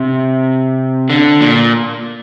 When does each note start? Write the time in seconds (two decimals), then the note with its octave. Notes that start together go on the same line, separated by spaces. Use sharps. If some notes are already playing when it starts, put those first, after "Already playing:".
Already playing: C3
1.10 D3
1.41 A#2